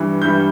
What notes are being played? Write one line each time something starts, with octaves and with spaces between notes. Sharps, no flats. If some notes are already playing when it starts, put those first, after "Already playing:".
Already playing: G2 E3 G3
G2 E3 G3 G6